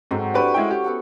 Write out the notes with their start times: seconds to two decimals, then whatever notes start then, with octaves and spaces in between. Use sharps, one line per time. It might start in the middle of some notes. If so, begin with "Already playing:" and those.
0.11 G#2 F#3 C4 A4
0.34 D4 E4 G4 B4 C#6 D6
0.54 G#3 C#4 E4 F#4 G5
0.70 G4
0.84 B3 A4 F#5